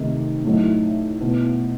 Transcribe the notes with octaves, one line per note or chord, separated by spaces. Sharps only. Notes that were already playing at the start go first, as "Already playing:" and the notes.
Already playing: C3 D#3 A3 D#4
A2 F#3 A3 D#4
B2 A3 E4